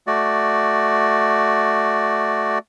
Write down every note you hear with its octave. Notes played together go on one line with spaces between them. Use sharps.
A3 F#4 D5